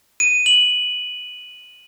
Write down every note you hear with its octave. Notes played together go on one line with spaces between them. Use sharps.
D#7
F#7